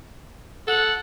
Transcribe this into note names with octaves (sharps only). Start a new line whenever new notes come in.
A4 F#5